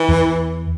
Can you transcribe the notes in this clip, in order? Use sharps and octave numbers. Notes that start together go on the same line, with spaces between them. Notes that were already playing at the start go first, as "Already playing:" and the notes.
Already playing: E3
E2